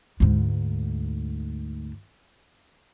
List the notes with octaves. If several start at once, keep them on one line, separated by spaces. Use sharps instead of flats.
D2 G#2